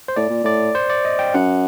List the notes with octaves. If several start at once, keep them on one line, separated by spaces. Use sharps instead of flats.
C5
A2 D5
A#2
A2 D5
C5
D5
D#5
G5
F#2 F#5